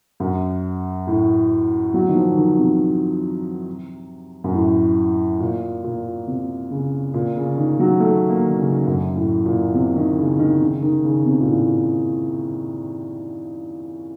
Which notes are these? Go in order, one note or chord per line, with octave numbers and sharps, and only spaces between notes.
F#2
A2
F#3
D#3
F3
D#3
C3
F#2
A2
A#2
A#2
C3
C#3
A#2
C#3
D#3
F#3
A3
A#3
D#3
C#3
F#2
A2
A#2
C3
D#3
C#3
D#3
C#3
D#3
C#3
C3
A#2
A2